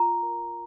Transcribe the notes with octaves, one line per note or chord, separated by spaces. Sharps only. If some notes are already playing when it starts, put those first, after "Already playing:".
Already playing: F4 A#5
A#4